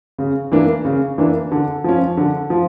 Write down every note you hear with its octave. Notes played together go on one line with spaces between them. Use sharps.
C#3
E3 A#3 D4
C#3
E3 A#3 D4
D3
F3 C#4
D3
F3